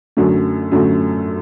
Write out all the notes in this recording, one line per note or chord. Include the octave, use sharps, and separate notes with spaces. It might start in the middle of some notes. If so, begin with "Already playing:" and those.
F#2 D3 F#3 A3
F#2 D3 F#3 A3